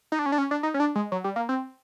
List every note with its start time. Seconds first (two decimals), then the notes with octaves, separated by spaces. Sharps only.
0.12 D#4
0.19 D4
0.26 C#4
0.32 D4
0.38 C#4
0.51 D4
0.63 D#4
0.74 C#4
0.80 D4
0.95 G#3
1.12 F#3
1.24 G3
1.36 A#3
1.49 C4